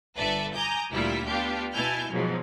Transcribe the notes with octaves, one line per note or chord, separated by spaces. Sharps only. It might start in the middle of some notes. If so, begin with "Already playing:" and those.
G1 A4 B4 D5 E5
G#5 A#5 D6 D#6 G6
D2 A#2 G3 E4 F4 B6
B3 D4 F4 G4 F5
B2 E4 G#5 A5 F6 G6
G#2 B2 F3 F#3